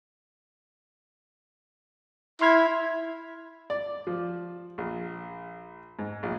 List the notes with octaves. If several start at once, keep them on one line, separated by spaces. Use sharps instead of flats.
E4 C6 F6 G#6
D5
F3
A#1
G#2
A#1